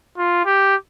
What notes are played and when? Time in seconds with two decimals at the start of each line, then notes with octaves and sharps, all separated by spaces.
0.17 F4
0.46 G4